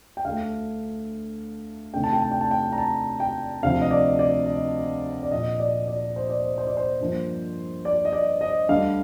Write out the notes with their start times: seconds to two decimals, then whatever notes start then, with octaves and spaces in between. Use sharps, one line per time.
0.17 G5
0.25 D2 D3 A3 F5
1.94 D2 C3 D#3 A3 G5
2.04 A5
2.13 G5
2.22 A5
2.31 G5
2.41 A5
2.51 G5
2.72 A#5
2.78 A5
3.20 G5
3.63 D2 C3 F3 F5
3.81 D#5
3.91 D5
4.19 D5
4.47 D#5
5.23 D5
5.31 A#2 F3 A#3 D#5
5.59 D5
5.87 D5
6.16 C5
6.29 D5
6.44 C5
6.58 C5
6.67 D5
6.77 C5
7.00 G2 F3 A#3
7.85 D5
8.05 D#5
8.13 D5
8.41 D#5
8.69 D2 D3 G3 F5